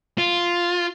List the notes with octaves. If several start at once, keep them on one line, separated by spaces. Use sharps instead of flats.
F4